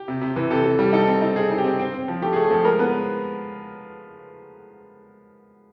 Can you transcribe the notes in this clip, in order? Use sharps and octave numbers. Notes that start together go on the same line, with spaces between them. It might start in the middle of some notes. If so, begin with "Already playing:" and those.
Already playing: G4
C3
C3
E3
C3 A4
C3
G3
D#4 A4
C4
D#4
C4 G#4
D#4
G4
C4
C4
C4
F3
A3 G4
G#4
A3
G#4
F3 A4
G#3 A#4
B3 B4